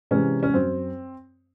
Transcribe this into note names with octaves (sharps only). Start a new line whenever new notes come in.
C3 E3 G#3 C#4
C#4
F#2 C4